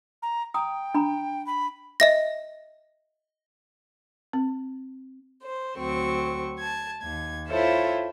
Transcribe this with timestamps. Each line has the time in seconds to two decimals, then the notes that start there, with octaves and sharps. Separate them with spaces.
0.22 A#5
0.54 G5 A#5 D#6
0.94 D4 A#5 B5
1.46 B5
2.00 D#5 E5 A#6
4.33 C4
5.44 C5
5.78 D2 F#3 C4 C#6
6.59 A5 G#6
7.02 D#2 G#6
7.48 E4 F4 A4 C5 C#5 E5